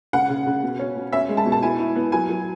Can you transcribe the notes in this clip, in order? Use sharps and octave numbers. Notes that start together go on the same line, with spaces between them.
C#3 F#5
C#3
C#3
B2
C#4
B2
C#4 E5
G#3
A5
B2
A5
E4 G#5
E4
B3
F#3 G#5
F#3